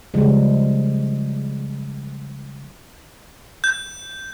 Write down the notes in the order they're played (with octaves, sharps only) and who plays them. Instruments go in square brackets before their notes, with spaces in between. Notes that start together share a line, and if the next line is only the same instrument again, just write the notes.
[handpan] C#3 F3 G3 G#3
[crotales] G6